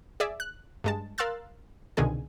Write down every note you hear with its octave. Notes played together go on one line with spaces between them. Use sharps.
G#4 D5 E5
F#6
G2 G#3 A5
A#4 F5 C6 E6 F#6 A6
C2 B2 D3 D#3 G#4 G#5